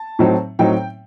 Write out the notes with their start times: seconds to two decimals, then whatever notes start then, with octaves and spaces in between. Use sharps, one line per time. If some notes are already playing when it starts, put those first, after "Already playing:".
Already playing: A5
0.19 A2 F#3 C4 D#4
0.59 A2 F#3 C4 D#4 G5